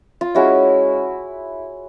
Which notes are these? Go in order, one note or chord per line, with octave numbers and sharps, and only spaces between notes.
F4
G#3 C#4 E4 F#4